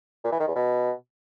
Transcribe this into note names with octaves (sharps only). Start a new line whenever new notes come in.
A#2
E3
D#3
E2
B2